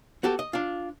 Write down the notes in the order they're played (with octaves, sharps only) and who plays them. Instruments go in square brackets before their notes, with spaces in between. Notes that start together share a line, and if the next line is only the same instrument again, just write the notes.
[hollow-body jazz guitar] B3 F#4 G4 A4
D#5
D4 F4